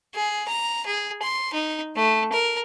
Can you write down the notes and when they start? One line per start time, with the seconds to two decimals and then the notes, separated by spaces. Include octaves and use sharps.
0.14 G#4
0.48 A#5
0.86 G#4
1.22 C6
1.53 D#4
1.96 A3
2.32 A#4